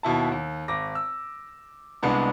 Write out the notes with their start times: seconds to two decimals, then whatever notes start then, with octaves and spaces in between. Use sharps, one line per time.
0.03 D#2 B2 E4 A5
0.32 D#2
0.68 G#1 D6 A#6
0.95 E6
2.03 C2 G#3 B3 D4